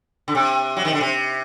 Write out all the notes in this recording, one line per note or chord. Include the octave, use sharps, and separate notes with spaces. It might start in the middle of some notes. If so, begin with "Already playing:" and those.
D3
C3
F#3
D#3
D3
C3